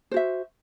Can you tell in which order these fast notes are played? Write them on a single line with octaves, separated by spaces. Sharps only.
C5 F#4 E5